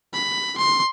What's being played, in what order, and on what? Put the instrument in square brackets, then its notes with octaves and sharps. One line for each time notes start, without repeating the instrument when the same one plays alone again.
[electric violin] B5
C6